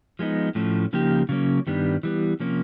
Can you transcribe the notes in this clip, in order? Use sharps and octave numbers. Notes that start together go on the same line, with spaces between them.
F3 G#3 B3 D#4
A2 F3 A3 C#4
C#3 F3 A#3 D#4 G4
C#3 F#3 A#3 C#4
G2 D#3 G3 B3 D4
E3 G3 B3
C3 F3 A#3 C#4